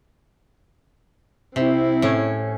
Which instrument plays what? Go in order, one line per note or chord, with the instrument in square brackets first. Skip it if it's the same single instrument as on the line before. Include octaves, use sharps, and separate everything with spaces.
[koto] C3 [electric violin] C4 E4
[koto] A2 C#4